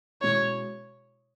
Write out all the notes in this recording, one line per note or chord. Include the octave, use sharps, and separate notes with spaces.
B2 G#3 C#4 E4 C#5